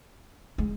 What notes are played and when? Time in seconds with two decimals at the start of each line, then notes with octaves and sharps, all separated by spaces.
0.58 G#3